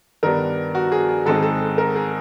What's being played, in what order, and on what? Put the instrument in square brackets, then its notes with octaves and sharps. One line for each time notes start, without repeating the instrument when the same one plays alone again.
[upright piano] G2 D#3 G3 B3 D4 A#4
F#4
G#4
G#4
G#2 D#3 G#3 C4 D#4 A4
G#4
A4
A#4
G#4